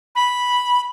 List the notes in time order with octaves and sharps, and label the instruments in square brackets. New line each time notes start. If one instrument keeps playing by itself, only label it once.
[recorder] B5